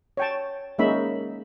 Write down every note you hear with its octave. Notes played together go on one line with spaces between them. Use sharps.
C#5 G5 A5
G#3 A#3 C#4 D#4 E5 B5